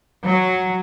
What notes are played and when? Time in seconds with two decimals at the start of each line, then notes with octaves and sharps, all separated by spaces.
0.25 F#3